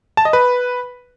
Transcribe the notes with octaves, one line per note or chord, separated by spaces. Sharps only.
A5
D#5
B4